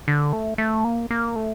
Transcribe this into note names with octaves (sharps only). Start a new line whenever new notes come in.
D3
A3
A3
A#3
A#3
A3